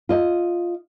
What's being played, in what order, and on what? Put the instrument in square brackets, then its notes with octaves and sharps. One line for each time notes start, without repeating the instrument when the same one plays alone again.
[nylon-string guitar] F4 D#5